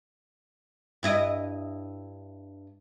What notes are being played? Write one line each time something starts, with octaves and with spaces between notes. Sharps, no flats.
G2 E4 D#5